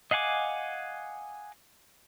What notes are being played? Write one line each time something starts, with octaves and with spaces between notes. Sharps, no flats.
D#5 F5 F#5 G#5 D6